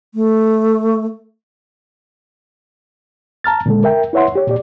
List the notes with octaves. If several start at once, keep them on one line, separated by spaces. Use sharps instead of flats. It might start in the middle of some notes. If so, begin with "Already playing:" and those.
A3
A5 A#5 F6 A6
A#2 D3 G#3 A4
A#4 E5 G5
E4 B4 C#5 E5 F#5 C6
G4 C#5
A#2 G4 D5